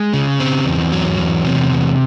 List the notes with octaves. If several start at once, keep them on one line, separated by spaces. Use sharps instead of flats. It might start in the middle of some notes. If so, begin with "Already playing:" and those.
Already playing: G#3
C#3
C4
E2
F#3
E2
C3
E2